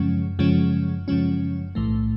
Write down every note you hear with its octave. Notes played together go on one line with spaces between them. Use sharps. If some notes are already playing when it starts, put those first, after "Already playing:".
Already playing: F#2 C#3 F3 G#3 C#4
F#2 C#3 F3 G#3 C#4
F#2 C#3 F3 G#3 C#4
B1 A2 E3 A3